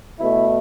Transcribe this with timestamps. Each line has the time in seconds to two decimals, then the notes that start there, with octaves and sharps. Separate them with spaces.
0.19 B2 A3 E4